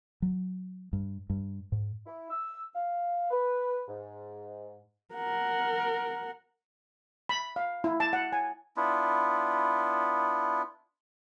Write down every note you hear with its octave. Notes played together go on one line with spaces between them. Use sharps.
F#3
G2
G2
G#2
E4
E6
F5
B4
G#2
A#4 F#5
B5
F5
E4
A5
F#5
G#5
B3 D4 E4 F4